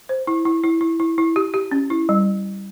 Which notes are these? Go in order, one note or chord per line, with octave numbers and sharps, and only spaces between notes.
C5
E4
E4
E4
E4
E4
E4
G4
G4
C#4
E4
G3